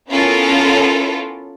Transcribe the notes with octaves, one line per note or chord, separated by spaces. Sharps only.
B3 C#4 E4 F4 A4 A#4